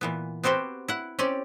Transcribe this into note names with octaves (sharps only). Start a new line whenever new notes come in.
A#2 E3 B3
B3 C4 F#4 G4 C5
E4 F#5
C4 C#4 G4 D5